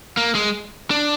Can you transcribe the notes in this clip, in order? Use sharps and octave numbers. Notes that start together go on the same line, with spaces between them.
A#3
G#3
D4